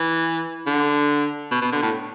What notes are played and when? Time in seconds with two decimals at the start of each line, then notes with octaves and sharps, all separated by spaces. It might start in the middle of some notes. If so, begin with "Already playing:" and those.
Already playing: E3
0.67 D3
1.51 B2
1.62 B2
1.72 D3
1.83 A2